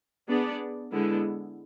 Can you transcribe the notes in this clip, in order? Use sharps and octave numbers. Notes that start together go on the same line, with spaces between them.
B3 D4 G#4 D5
D3 G#3 B3 E4